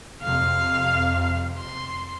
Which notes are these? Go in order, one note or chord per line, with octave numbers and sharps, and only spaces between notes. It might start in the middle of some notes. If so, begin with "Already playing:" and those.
F2 C3 F5
C6